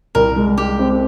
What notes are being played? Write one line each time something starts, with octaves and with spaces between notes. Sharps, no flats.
C2 A#4
G#3
G#3 G4
C4